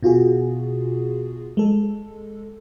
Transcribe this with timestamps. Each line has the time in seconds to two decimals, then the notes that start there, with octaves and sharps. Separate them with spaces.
0.03 B2 F4 F#4 G#4
1.57 G#3 A4